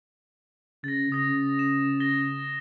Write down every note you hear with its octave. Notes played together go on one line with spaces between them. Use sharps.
C#3 A6 A#6
C#3 D#6 A#6
E7
A6 A#6 G7